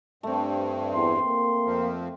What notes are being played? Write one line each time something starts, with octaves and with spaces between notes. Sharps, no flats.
G2 A3 C4
E2 C6
A#3
F2 F3